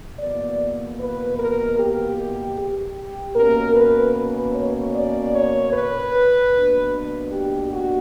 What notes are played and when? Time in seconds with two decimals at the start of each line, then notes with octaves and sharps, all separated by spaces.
0.18 E2 B2 A#3 D5
0.98 B4
1.37 A#4
1.77 G4
2.56 G4
3.34 B2 A#3 C#4 A#4
3.74 B4
4.14 B4
4.54 C#5
4.93 D5
5.33 C#5
5.72 B4
6.51 B2 A#3 D4
7.30 G4
7.70 F#4